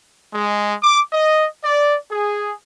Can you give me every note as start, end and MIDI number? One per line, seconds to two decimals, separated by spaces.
0.32 0.73 56
0.82 1.00 86
1.12 1.47 75
1.63 1.96 74
2.10 2.53 68